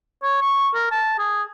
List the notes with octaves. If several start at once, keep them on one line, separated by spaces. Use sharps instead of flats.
C#5
C#6
A#4
A5
G#4